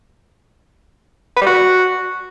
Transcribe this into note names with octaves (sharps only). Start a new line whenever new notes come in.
B4
G3
F#4